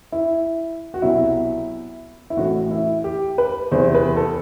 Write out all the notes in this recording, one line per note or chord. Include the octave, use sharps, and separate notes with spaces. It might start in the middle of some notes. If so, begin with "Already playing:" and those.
E4
F#4
C2 B2 F#3 E4
E4
A1 A2 E3 F#4
E4
G4
B4
E2 C3 E3 C5
B4
A4